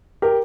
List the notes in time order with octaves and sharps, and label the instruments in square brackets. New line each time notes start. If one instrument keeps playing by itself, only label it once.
[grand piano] G4 A#4